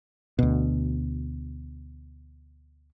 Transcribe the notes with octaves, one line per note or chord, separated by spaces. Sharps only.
D2 B2